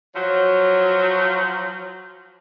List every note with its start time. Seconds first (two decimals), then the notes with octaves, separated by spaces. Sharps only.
0.15 F3 F#3